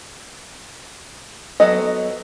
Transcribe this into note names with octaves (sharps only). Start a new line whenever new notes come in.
F#3 B3 A4 D#5